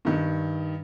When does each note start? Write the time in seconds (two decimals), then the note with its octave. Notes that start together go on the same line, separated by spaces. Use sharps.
0.05 G2 D#3